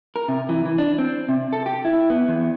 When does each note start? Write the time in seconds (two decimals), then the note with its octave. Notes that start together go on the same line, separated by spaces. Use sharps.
0.16 A#4
0.28 C3
0.49 E3
0.65 E3
0.78 D4
0.99 C4
1.29 C3
1.53 A4
1.66 G4
1.85 E4
2.10 B3
2.28 E2